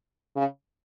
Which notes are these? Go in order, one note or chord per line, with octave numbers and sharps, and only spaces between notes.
C#3